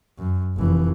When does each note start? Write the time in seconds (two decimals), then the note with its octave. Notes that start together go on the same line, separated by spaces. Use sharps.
0.19 F#2
0.56 F1 E3